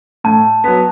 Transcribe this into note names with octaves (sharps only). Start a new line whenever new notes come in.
A2 A5
F#3 B3